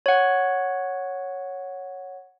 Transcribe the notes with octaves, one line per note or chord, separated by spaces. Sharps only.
C#5 F#5